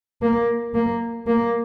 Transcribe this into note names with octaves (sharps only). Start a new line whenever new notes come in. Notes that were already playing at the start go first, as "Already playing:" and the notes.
A#3
A#3
A#3